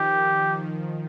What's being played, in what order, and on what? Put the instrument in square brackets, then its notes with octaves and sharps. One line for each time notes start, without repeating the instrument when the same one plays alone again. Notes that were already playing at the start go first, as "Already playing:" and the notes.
Already playing: [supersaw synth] D#3 F3 [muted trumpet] G4